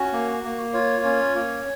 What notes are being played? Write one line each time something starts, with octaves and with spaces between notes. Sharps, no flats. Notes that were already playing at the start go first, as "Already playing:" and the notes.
Already playing: C#4 F#4
A#3
A#3
F4 C#5
C#4
A#3